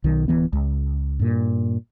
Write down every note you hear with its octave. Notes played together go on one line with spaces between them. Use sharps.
B1 D#3
D1 D2 E3 B3
C#2
G2 A#2